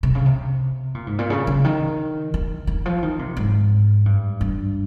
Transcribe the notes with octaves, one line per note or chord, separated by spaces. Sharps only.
C3
C#3
C3
A#2
G#2
A#2
C#3
C#3
D#3
D#3
D#3
F3
D#3
C3
G#2
G2
G2